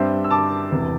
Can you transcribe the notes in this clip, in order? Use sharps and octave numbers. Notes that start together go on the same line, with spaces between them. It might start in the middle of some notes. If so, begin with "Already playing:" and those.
Already playing: G2 G3 C4 C5 E5
E6
A5 D6
E1 E2 C3 E3